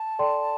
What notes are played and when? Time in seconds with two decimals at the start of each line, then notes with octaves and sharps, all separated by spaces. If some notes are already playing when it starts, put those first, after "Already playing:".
Already playing: A5
0.19 A4 D5 G5 C6